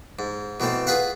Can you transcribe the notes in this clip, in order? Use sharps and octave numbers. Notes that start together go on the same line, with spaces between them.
G#2
B2 E3 A3 C4
F4 G#4 B4 F5 F#5